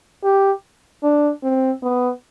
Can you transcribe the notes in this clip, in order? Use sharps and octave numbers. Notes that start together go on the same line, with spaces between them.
G4
D4
C4
B3